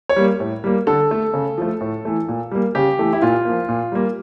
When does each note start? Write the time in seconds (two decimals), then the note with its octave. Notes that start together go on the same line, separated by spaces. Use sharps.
0.09 C#5
0.16 G3 A#3
0.40 A2
0.64 G3 A#3
0.87 D3 A4
1.11 A3
1.34 C#3
1.58 F3 A3
1.81 A2
2.05 E3 A3
2.28 A#2
2.51 G3 A#3
2.75 C#3 G4
2.98 E3 A3
3.13 E4
3.22 A#2 F4
3.45 F3 A#3
3.69 A#2
3.92 G3 A#3